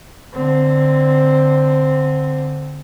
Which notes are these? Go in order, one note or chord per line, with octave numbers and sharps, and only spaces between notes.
D3 C4